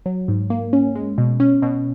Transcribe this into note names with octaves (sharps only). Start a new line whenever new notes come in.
F#3
G#2
A#3
C#4
G#3
B2
C#4
B2